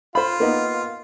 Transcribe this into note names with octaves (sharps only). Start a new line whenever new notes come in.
F4 C5 B5
A#3 B3 D#4